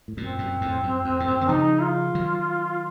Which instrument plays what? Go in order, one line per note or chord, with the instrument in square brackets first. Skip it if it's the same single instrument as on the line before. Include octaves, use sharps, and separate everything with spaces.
[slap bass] A2
[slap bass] F#2 A#2 [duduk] C4
[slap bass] F#2 A#2
F2 A2
F#2
F2
A2
F#2
D#3
[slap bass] C#3 F3 [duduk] D#4
[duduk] F4
[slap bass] D#3 F#3